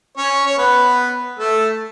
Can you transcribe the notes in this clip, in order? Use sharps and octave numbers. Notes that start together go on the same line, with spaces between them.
C#4 C#5
C#5
B3 B4
A3 A4